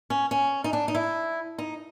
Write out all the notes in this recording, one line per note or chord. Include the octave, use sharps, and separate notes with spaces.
C#4
C#4
D#4
D4
D#4
E4
D#4